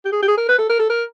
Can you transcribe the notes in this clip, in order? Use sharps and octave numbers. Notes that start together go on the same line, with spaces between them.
G4
G#4
G4
G#4
A#4
B4
A4
A#4
A4
A#4